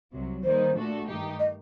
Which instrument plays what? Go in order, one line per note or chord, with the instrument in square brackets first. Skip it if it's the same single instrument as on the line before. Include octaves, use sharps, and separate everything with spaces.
[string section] C2 C3 F#3
[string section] D#3 G3 A#3 D#4 [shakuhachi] C5
[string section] A#2 A3 D4 F#4 A4
G2 D#3 A3 D#4 G4
[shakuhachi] D#5